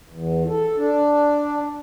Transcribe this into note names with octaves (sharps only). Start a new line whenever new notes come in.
E2
A4
D4